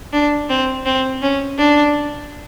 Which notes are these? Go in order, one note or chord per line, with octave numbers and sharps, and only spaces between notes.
D4
C4
C4
C#4
D4